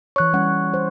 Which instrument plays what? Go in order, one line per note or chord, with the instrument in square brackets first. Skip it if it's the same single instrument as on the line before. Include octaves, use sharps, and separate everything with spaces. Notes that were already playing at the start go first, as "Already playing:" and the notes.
[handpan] E3 C#5 [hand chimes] C#6 F#6
[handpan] G3 C#4 F#5
C5